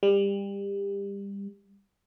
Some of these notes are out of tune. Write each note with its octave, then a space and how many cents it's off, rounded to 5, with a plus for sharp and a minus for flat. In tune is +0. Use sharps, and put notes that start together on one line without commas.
G3 +25